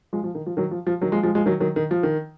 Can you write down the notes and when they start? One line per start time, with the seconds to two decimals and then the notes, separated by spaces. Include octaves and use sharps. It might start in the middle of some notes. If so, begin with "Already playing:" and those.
0.13 F3 G#3
0.24 F3
0.35 D#3
0.46 F3
0.57 D#3 F#3
0.71 F3
0.87 F3
1.01 D#3 F#3
1.12 F3 G#3
1.23 F3 G#3
1.35 F3 G#3
1.46 D#3 F#3
1.60 D#3 F#3
1.76 D#3
1.91 F3
2.03 D#3